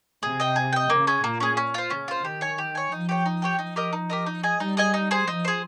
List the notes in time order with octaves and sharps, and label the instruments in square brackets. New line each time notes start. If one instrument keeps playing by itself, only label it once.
[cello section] C3 [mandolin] G#4
[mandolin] D#5 G5
G#4
D#5 G5
[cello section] C#3 [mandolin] A#3
[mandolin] C#4 G#4
[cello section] A#2 [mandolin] A#3
[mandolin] C#4 G#4
C#4
F4 C5
[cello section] C#3 [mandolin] C#4
[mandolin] F4 C5
[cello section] D#3 [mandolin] G4
[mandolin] C#5 G#5
G4
C#5 G#5
[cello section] F3 [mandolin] D#4
[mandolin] G4 C#5 G5
D#4
G4 C#5 G5
[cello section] F3 [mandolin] D#4
[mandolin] G4 A#4 D#5
D#4
G4 A#4 D#5
D#4
G#4 D#5 G#5
[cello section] G3 [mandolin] D#4
[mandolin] G#4 D#5 G#5
D#4
G#4 C5
[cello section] F3 [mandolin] D#4
[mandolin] G#4 C5